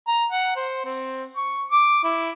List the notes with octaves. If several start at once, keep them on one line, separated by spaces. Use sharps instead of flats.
A#5
F#5
C5
C4
C#6
D6
E4